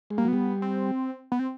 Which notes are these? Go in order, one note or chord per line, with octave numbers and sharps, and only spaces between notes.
G#3
G3 A#3
F#3
G3 B3
C4
B3
C4